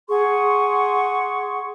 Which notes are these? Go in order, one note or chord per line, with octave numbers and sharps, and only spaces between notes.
G#4 F#5 C6 C#6